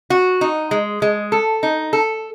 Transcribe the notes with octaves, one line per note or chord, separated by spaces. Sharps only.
F#4
D#4
G#3
G#3
A4
D#4
A4